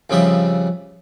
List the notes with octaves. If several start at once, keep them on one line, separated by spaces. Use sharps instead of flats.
F2 C#3 F3 G3 E5 D#6